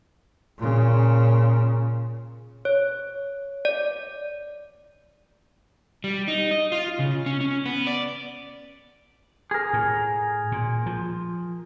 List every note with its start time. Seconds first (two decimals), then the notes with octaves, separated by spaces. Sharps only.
0.58 A#2 C#3
2.65 C#5
3.65 D5
6.04 G3
6.28 D#4
6.51 D#5
6.72 F4
6.99 C#3
7.26 C#4
7.41 C#4
7.66 B3
7.87 D5
9.51 G#4 A#4
9.73 A2
10.52 A#2
10.86 F3